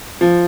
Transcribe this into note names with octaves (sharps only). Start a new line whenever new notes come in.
F3